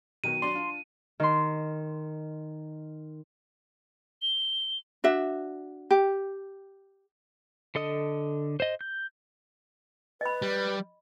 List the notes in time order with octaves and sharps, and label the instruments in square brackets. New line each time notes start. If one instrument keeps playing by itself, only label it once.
[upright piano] B2 D#3 F#3 [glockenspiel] D#7
[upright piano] F#3 D4 D5 [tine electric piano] C6
[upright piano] D4 F4
[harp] D#3 C6
[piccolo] G7
[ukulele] D4 F#4 E5
G4
[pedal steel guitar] D3 A4 D#5 D#6
C5 D#5
G6
[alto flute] B4 [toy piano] D#5 B5
[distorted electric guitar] G3